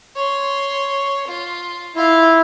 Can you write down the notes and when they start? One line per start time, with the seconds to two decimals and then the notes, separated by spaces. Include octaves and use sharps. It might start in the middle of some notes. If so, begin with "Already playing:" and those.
0.16 C#5 C6
1.27 F4
1.96 E4 F4 F5